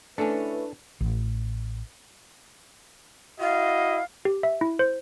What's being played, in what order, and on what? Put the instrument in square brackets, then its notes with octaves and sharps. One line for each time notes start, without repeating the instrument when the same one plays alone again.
[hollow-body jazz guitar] A3 C#4 [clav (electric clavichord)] D4 A4 [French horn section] E4 B4
[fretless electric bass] A1
[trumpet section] E4 F#4 D#5 [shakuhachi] F5
[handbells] G4
E5
E4
C5